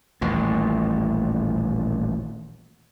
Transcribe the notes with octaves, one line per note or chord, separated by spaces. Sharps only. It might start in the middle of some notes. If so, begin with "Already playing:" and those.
D#1 A1 A#2